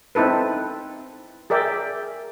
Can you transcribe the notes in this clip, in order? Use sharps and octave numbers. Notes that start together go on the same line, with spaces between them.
C4 D#4 E4 A4 B4
G#4 A#4 D5 E5 G5